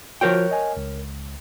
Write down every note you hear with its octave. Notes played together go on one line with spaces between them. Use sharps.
F3 F#4 A#4 C#5 G5
D#5 G#5
C#2